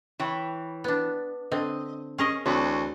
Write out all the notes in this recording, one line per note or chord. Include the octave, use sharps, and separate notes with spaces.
E3 C#5 G5
B3 D4
D3 C4 D#5
C#4 G#4 A#4 D#5
D2 E3 C4 C#5